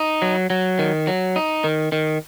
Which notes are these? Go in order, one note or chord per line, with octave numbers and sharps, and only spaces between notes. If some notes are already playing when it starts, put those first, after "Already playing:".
Already playing: D#4
F#3
F#3
D#3
F#3
D#4
D#3
D#3